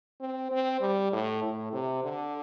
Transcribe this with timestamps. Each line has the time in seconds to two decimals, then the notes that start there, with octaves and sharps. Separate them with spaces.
0.20 C4
0.51 C4
0.81 G3
1.12 A2
1.43 A2
1.73 C3
2.04 D3